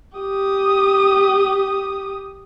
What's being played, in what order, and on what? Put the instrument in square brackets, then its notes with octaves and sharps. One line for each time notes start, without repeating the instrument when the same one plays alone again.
[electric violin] G4 D#6